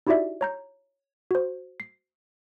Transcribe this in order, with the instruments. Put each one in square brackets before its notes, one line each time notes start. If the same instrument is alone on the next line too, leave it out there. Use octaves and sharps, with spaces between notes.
[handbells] D#4 E4 F#4 G4 D5 E5
C#5 A#5 G6
F#4 C5
C7